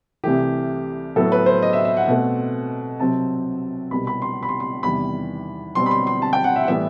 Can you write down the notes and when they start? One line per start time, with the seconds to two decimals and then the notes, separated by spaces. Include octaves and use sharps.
0.24 C2 C3 E3 A3 G4
1.16 A2 F#3 B3 A4
1.32 B4
1.46 C5
1.62 D#5
1.73 E5
1.85 E5
1.97 F#5
2.08 B2 A3 C4
3.00 C2 C3 F#3 C4 A5
3.91 C2 B2 G3 B5
4.07 B5
4.22 C6
4.43 B5
4.49 C6
4.60 C6
4.83 E2 C3 D#3 G3 B5
5.75 B2 G3 C4 C6
5.86 B5
5.91 C6
6.07 C6
6.22 A5
6.33 G5
6.44 F#5
6.56 E5
6.63 F#5
6.68 A2 E3 G3 B3 E5